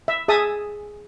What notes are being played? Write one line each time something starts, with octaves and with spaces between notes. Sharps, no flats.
E5
G#4 E5 A5 D#6